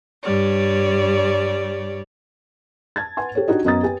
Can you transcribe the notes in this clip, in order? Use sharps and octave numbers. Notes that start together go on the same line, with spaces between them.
G2 G3 C#5 D5
A5 G#6 A6
B4 F#5 G#5 C6
G4 A4 C5 C#5
D4 D#4 F#4 G4 D#5
F#2 B3 D#5 A#5 D#6 A6
G4 B4 G#5